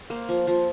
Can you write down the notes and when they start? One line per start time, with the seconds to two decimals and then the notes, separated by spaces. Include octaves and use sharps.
0.10 A#3 C5
0.29 F3
0.47 F3